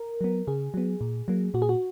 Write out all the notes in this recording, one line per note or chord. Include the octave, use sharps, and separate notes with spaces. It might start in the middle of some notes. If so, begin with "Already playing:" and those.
Already playing: A#4
F#3 B3
C#3 G#4
F#3 B3
A#2
F#3 A#3
A#2 F#4
G#4
F#4